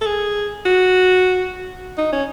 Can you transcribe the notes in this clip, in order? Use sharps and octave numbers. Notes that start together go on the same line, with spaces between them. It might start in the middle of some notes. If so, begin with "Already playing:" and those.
A4
G#4
F#4
D#4
C#4